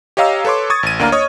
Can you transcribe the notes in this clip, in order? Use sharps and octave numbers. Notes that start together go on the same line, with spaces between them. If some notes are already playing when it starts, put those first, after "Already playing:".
G4 C#5 D#5 F5 A#5 E6
A4 B4 C#5 C6 D6
C#6 D#6 G#6 A6
A1 D#7
D2 A#3 D4 F5 A#5 F6
C#5 D#5 C#6 D#6 G#6